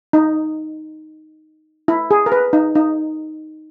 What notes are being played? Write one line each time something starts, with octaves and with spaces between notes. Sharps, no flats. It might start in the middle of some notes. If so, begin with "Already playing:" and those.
D#4
E4
G#4
A#4
B4
D#4
D#4